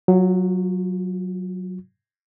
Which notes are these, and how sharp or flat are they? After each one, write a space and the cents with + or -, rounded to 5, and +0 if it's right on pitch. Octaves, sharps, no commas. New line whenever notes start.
F#3 +0 F4 +30